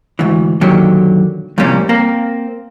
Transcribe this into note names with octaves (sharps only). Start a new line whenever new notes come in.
D2 G#2 E3
F#2 A#2 D3 D#3 F#3 G4
F2 A2 C3 G3 A#3 C#4
A#3 C4